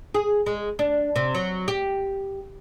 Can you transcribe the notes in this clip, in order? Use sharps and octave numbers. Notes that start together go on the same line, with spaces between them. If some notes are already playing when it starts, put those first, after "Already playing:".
G#4
G#3
D4
C3
F#3
G4